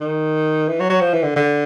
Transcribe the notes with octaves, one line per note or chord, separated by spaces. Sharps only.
D#3
E3
F#3
F#3
F3
E3
D3
D3